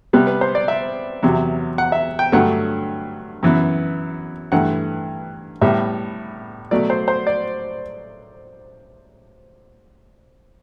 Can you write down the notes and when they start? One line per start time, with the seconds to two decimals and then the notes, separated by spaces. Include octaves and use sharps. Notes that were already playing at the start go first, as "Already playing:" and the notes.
0.13 C3 G3 B3 B4
0.27 B4
0.41 C5
0.55 D5
0.68 E5
1.23 E2 C3 F#3
1.78 F#5
1.92 E5
2.19 G5
2.32 G2 D3 F#3 A3 F#5
3.43 F#2 E3 B3
4.52 G2 E3 A3 F#5
5.61 A2 G3 B3 E5
6.71 B2 F#3 A3 D5
6.90 C5
7.08 C5
7.27 D5